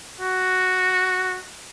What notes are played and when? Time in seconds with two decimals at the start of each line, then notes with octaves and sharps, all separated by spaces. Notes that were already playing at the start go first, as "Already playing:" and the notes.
0.21 F#4